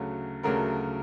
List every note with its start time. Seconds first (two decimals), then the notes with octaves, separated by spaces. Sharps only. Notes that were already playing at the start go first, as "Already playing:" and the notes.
Already playing: D2 C#3 F#3 A3
0.43 D2 C#3 F#3 A3 A#4